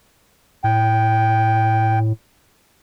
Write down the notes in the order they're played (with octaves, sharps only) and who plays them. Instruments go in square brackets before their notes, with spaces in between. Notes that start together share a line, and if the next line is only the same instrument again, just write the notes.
[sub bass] A2 [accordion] G5